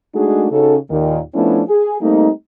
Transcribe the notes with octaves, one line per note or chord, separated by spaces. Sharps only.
G#3 A3 D4 D#4 F#4 G#4
C#3 C#4 D#4 F#4 A4
D#2 A#2 D#3
F3 A3 B3 C#4 D4 E4
G#4
G3 A3 A#3 C4 D#4